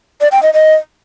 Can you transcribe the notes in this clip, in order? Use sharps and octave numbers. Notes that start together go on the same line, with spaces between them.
D5
G5
D#5
D#5